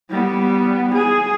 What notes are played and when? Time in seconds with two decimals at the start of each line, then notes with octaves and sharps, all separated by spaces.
0.11 G3 B3
0.96 G#4